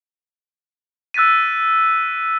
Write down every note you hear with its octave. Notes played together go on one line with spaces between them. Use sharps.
E6 F#6 A6 B6 D#7